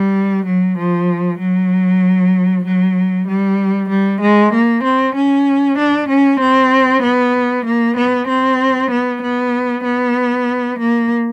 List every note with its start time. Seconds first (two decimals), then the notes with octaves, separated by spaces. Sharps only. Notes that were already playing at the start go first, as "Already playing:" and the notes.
Already playing: G3
0.45 F#3
0.77 F3
1.39 F#3
2.65 F#3
3.27 G3
3.89 G3
4.21 G#3
4.53 A#3
4.84 C4
5.15 C#4
5.78 D4
6.09 C#4
6.40 C4
7.03 B3
7.65 A#3
7.96 B3
8.27 C4
8.91 B3
9.22 B3
9.84 B3
10.79 A#3